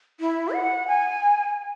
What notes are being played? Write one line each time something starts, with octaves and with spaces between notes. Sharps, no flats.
E4
F#5
G#5